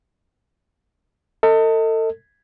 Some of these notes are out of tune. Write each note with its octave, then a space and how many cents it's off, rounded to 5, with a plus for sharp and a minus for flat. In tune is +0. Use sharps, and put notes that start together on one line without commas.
A4 +35 D#5 +20